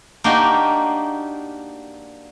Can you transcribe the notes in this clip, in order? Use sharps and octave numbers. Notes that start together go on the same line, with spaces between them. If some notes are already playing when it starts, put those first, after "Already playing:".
A#3 D4 D#4 F#4 G4